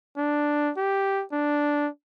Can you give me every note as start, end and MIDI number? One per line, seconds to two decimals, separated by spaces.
0.17 0.71 62
0.77 1.24 67
1.32 1.88 62